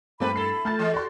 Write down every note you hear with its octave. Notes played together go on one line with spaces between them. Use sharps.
G2 A3 A#3 C4 G4 A4 B4 B5
E4 A4 C7
A3 A5 F6 G6 A6
E3 G#3
F#4 G4 D5 C6